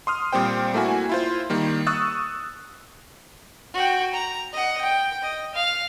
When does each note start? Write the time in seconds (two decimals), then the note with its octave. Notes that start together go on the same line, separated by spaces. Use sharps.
0.07 C6 D#6 F6
0.32 A#2 G3 C4 C5 G5
0.74 A3 A#3 E4 F#4 G#5
1.09 E4 F4 C5
1.50 D#3 G3 A#3
1.87 C#6 D#6 E6 F#6 A6
3.74 F#4 G5
4.13 A#5
4.52 D#5 F#5
4.81 G5
5.22 D#5
5.54 F5